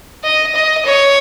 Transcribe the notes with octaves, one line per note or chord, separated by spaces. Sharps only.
D#5
D#5
C#5